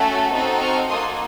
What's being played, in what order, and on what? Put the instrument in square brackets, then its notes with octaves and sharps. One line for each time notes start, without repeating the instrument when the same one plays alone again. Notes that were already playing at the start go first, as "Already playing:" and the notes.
Already playing: [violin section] A3 C#4 F#4 A4
C4 D#4 F#4 A4
C#6 F6
A#3 D#4 F#4 A4 C6 D#6